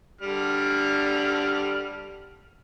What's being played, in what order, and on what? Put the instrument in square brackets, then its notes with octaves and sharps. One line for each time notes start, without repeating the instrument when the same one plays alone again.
[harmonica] D3 G3 F6